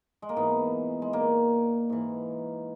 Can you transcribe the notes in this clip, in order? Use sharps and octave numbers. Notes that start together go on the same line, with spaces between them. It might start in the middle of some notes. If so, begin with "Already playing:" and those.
G#3
A#3
G#2 E3 B3
G#3
A#2 A#3
G#2 E3